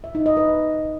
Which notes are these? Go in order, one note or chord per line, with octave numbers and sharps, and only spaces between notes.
E5
D#4
D#5
B4